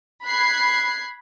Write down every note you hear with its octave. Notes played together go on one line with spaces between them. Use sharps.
B5 F#6 G#6 C7